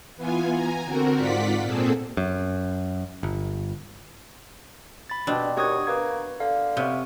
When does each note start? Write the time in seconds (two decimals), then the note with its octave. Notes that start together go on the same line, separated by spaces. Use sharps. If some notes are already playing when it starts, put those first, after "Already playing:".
0.16 E3 B3 F4 G#5
0.54 G#5 A#5
0.85 D3 C4 F#4 A#4
1.17 G#2 F4 D5 F#5 B6
1.63 A#2 C4 G#4 A4
2.17 F#2
3.23 G1
5.10 B5 A6
5.27 G2 B2 C4 D4
5.57 D#2 F#4 G4 C#5 D#6 G#6
5.87 A#3 B4 G#6
6.40 D3 F5
6.77 C3 B3 C#4